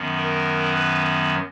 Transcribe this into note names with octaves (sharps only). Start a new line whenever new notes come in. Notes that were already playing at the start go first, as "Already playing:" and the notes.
Already playing: F#2 D#3 F#3 B3
A#4
B4